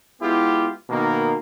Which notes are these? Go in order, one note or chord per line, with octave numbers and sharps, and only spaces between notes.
G#3 B3 E4 F4 G4
B2 D#3 A#3